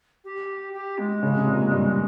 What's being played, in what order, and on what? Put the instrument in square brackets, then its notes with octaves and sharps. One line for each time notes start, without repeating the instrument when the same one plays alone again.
[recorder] G4
G4
G#3
[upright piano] C#3
C3
A#2
G2